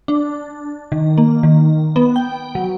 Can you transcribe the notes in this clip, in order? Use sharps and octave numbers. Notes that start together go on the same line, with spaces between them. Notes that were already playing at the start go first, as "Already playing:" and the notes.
D4
D#3
A#3
D#3
B3
G5
F#3